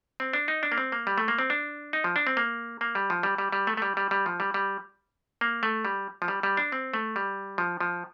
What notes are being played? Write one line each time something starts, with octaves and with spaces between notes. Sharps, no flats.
C4
D4
D#4
D4
A#3
C4
A#3
G3
A3
A#3
C4
D4
D#4
F3
D4
C4
A#3
A#3
G3
F3
G3
G3
G3
A3
A3
G3
G3
G3
F3
G3
G3
A#3
A3
G3
F3
G3
G3
D4
C4
A3
G3
F3
F3